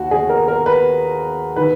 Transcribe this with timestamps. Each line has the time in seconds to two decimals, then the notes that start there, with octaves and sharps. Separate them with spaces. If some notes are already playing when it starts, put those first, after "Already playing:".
Already playing: D#2 F#4
0.11 G#4
0.30 A#4
0.48 A#4
0.66 B4
1.56 D#3 B4